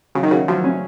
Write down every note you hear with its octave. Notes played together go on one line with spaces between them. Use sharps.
C#3 F#3
D#3
C#3 F#4
F3 F#3
C#4